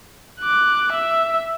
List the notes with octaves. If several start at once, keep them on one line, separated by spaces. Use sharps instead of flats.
D6 F#6
E5